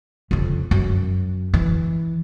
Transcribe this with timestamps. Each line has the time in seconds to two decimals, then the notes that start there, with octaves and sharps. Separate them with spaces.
0.31 F2 C#3
0.71 F#2
1.54 E3